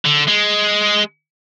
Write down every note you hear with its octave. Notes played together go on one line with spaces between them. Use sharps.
D3
G#3